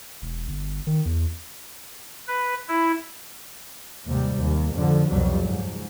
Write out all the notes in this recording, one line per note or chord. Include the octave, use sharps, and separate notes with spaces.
E1
G1
D#3
E2
B4
E4
D#2 G#2 C3 G3
D#2
F2 G#2 D3 F3
C2 F2 B2 F#3 G3
C#2 G#2